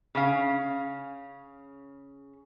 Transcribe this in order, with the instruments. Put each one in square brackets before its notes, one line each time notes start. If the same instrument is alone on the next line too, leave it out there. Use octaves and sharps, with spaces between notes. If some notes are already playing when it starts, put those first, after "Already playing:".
[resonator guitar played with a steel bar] C#3 C#4 F5